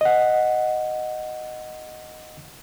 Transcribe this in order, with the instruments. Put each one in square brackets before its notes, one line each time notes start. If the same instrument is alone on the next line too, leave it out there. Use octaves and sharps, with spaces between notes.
[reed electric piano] D#5 F#5